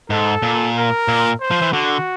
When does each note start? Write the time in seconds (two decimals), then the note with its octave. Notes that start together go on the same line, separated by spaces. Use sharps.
0.10 G#2 A4
0.42 A#2
0.75 A#4
1.08 A#2
1.40 C5
1.51 F3
1.62 E3
1.72 D3 F#4